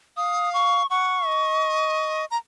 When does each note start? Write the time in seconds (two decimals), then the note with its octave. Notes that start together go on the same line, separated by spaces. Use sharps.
0.17 F5 D#6
0.54 C#6
0.90 F#5 C#6
1.27 D#5
2.31 A#5